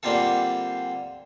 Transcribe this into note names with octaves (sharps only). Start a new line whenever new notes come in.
D3 G3 A#3 C4 F4 A4